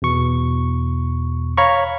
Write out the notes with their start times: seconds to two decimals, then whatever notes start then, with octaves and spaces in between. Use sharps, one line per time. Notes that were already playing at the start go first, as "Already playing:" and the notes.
0.02 E2 B2 C#6
1.57 C#5 F5 A#5 B5 C#6